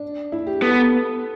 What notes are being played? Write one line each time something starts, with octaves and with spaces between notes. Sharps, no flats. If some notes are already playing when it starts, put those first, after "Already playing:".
Already playing: D4
E4
G4
B3 A4